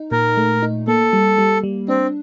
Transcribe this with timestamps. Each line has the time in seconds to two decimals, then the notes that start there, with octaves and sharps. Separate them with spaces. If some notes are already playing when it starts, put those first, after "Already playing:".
Already playing: D#4
0.12 A#2 A#4
0.37 A3
0.63 D#4
0.88 A#3 A4
1.13 G3
1.38 G3
1.63 G3
1.88 C4 D4